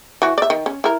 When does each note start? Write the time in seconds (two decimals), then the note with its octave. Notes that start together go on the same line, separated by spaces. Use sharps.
0.22 E3 F#4
0.38 D5 E5
0.50 D#3
0.66 C#4
0.84 E4 A#4